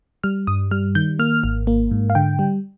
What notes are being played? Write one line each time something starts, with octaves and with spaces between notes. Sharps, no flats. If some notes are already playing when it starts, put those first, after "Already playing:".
G3 F6
G2 D#6
G3 F6
D#3 G6
A#3 F6
G#1
A#3
G#2
F5
D3 G5
G3